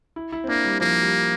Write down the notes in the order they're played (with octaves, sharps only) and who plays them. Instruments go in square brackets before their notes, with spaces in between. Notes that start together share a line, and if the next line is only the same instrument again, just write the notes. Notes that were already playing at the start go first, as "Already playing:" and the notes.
[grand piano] E4
E4
C4
[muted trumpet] A#3 [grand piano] D4
[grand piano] G3
[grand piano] F3 [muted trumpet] A#3
[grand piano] G3